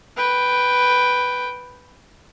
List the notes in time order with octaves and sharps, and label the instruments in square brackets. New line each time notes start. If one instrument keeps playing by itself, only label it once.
[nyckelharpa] B4 G5